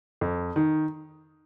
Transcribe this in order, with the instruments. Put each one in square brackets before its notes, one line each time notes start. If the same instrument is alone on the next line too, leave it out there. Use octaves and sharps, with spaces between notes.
[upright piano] F2
D#3